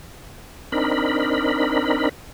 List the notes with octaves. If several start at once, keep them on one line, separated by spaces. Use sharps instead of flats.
C4 D4 D#4 A#4 B5